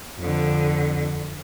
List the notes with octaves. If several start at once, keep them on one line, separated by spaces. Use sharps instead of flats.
F2 D3